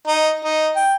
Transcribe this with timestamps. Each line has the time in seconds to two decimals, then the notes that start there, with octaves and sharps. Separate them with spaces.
0.07 D#4
0.44 D#4
0.76 G5